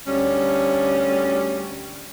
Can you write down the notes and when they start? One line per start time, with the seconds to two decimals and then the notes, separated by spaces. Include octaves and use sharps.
0.06 D2 G3 C#4